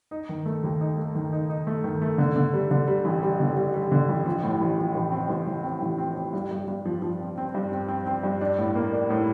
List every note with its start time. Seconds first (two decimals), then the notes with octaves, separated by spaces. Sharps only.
0.11 D#4
0.29 D#3
0.46 A3
0.64 D#2
0.81 D#4
0.97 A3
1.15 D#3
1.33 D#4
1.49 D#4
1.67 A3
1.84 D#3
2.02 A3
2.18 D3
2.36 D3
2.53 G3
2.71 D3
2.88 G3
3.05 A1
3.23 G3
3.40 D3
3.57 G3
3.74 G3
3.92 D3
4.09 A1
4.26 F3
4.44 A2
4.61 A1
4.78 F3
4.95 A1
5.12 C4
5.30 A1
5.47 A1
5.64 C4
5.82 A1
5.98 C4
6.16 C4
6.33 G2
6.51 G2
6.68 G2
6.85 F3
7.02 F3
7.20 C4
7.38 C4
7.55 G2
7.72 C4
7.88 C4
8.06 C4
8.23 G2
8.41 D4
8.58 A2
8.76 A#3
8.93 D4
9.10 A2